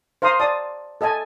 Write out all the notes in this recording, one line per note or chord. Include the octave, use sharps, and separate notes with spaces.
C5 F5 A#5 C6 D#6
D5 A5 D#6
A4 D#5 E5 G#5 A5